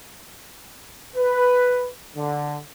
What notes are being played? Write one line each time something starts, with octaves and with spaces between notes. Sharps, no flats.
B4
D3